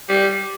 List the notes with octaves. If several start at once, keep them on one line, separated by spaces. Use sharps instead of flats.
G3